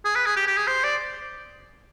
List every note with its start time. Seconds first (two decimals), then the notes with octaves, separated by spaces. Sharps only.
0.05 G#4
0.15 B4
0.26 G#4
0.36 G4
0.47 G4
0.57 G#4
0.68 C5
0.84 D5